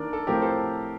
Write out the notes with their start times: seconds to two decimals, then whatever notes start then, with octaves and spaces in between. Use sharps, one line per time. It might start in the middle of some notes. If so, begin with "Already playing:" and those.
Already playing: D#3 A#3 D4 A#4 D5
0.13 A4
0.27 A2 F3 C4 G4 A#4
0.41 A4 C5